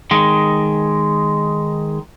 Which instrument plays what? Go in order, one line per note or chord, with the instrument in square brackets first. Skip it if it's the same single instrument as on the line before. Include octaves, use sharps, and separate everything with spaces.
[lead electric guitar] D#3 G#3